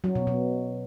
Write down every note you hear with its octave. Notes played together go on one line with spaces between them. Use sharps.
F#3
B2
B2